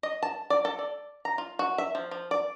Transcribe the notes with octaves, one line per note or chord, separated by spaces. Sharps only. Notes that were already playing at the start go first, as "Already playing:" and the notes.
D#5
A5
D5
A4
D5
A#5
F4
F#4
E5
F3
F3
D5